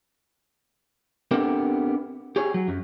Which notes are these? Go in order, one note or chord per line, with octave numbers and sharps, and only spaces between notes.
B3 C4 D4 G4 A4 A#4
G4 G#4 C#5
F#3
F#2